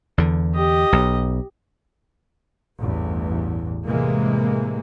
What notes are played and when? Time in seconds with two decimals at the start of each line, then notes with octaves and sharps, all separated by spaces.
0.18 E2 D3
0.55 G4 D#5
0.93 B1
2.79 A1 E2 G2
3.86 A2 C3 E3 G#3 A#3